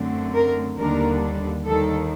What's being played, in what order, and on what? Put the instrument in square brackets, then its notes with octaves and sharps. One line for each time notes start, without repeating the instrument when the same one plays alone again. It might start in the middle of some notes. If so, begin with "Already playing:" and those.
Already playing: [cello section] F#2 D3 A3 C4
A#4
D#2 D3 G3 D4 A#4
D#2 D#3 G3 A4